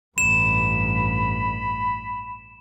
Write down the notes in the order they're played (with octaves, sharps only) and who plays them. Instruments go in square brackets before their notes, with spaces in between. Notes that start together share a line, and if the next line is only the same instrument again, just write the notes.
[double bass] A1 G2 [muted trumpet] B5 [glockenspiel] E7